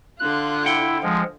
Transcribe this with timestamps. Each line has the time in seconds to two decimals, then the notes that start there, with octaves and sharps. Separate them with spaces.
0.20 D3 F4 F#6
0.66 E4 F#5 G5
1.03 F3 G#3